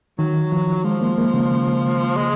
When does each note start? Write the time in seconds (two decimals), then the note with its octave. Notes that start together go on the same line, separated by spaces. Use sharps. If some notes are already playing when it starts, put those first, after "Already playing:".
0.19 D#3 F#3
0.52 F3
0.84 F3 G#3
1.01 A#3
1.18 A#3
1.34 C#3
2.16 G#3